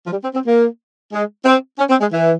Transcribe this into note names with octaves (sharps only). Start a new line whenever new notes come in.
F3
G3
C4
C4
A#3
G#3
C4
C#4
C4
G#3
E3